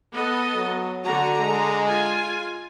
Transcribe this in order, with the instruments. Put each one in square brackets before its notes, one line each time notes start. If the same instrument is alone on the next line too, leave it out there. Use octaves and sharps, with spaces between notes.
[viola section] B3 A4 D#5
[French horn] F#3
[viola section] D3 A#5 [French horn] F#4
[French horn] G#3
[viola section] F4 G#5